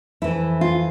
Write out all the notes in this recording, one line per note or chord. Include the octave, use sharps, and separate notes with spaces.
F2 E3 E4
F4